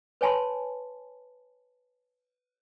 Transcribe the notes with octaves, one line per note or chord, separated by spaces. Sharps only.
B4 C#5 G#5 A5 B5 C6